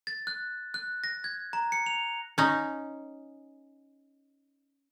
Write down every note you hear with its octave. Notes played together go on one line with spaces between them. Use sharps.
A6
F#6
F#6
A#6
G#6
A#5
C#7
F7
C#4 D#4